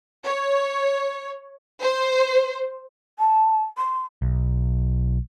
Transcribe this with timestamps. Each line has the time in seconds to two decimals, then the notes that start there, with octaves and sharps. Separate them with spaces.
0.24 C#5
1.80 C5
3.19 A5
3.77 C6
4.22 B1